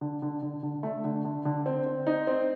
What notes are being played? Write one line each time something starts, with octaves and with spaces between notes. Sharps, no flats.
D3
D3
D3
D3
A3
D3
D3
D3
C4
C4
D#4
C4